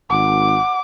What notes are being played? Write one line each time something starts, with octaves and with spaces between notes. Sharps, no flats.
G#1 F#5 D6